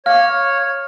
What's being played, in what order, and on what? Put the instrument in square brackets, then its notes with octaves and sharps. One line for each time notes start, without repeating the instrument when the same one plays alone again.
[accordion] C#5 [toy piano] F5 D6 [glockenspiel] F6